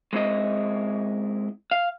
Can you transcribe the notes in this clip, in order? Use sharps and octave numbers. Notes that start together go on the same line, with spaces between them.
G#3 C4 E4 D#5
F5